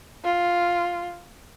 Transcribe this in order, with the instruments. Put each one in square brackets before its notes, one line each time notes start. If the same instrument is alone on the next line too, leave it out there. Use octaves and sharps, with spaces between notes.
[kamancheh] F4